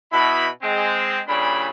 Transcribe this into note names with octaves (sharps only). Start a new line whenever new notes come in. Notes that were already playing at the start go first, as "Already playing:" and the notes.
B2 E4 B5
G#3 C4
A#2 C#3 G3 D4 B5